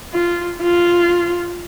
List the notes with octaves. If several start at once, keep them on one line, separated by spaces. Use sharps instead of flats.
F4
F4